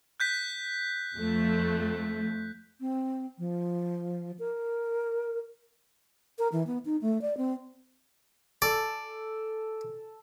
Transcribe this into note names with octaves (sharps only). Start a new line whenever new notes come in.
F#6 G6 B6
F2 F3 A3
C4
F3
A#4
A#4
E3
B3
D#4
A3
D5
C4
A4 D5